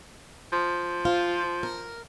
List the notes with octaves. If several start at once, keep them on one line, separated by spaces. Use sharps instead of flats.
F3
F4 C5
A#4